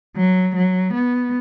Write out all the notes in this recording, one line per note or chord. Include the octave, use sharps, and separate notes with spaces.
F#3
F#3
B3